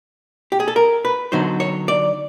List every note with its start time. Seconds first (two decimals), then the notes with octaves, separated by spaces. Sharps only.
0.52 G4
0.60 G#4
0.68 A4
0.76 A#4
1.05 B4
1.32 D3 F#3 B3 D#4 C5
1.60 C#5
1.88 D5